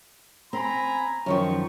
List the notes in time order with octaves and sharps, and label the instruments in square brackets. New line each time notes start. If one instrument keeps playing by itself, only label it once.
[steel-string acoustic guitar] C4 [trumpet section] G#5 A#5 B5
[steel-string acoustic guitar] F#2 D#3 F3 [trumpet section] C#6